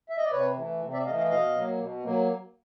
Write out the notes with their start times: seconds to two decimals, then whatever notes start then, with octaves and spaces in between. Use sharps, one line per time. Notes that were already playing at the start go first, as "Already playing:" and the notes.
0.09 E5
0.18 D#5
0.24 D5
0.32 C3 B4 C#5
0.56 E3 A3
0.82 C3
0.93 D5 E5
1.05 A3 D#5 F5
1.10 E3
1.17 D#5 F5
1.30 B2 D#5 F5
1.55 F#3 A#3
1.79 B2
2.04 F#3 A#3